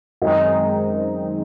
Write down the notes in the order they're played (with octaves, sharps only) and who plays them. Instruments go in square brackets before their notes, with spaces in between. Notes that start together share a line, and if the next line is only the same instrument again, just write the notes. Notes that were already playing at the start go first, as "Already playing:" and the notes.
[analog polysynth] F#2 D#3 G#3 C4 D#4 [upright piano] D#5